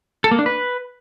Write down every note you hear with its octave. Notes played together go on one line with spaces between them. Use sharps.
A4
A#3
D4
B4